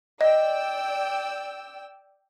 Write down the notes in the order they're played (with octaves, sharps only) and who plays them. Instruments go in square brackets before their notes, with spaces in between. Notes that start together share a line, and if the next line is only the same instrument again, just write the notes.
[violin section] D5 G5 E6 [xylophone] D#5